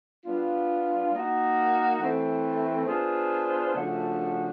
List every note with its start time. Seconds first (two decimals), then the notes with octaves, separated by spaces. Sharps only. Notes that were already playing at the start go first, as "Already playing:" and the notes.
0.25 G3 B3 D4 F4
1.12 A#3 D#4 F#4
2.00 E3 A3 C4
2.87 B3 D4 F4 G#4 C5
3.74 C#3 F3 A3 D4 F#4